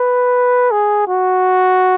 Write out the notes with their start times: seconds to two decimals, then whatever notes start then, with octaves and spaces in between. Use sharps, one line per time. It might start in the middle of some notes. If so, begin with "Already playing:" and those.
Already playing: B4
0.71 G#4
1.08 F#4